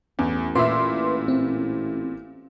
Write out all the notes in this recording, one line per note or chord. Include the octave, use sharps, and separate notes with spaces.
A1 E2
A#2 E4 B4 E5 C6 D6
C4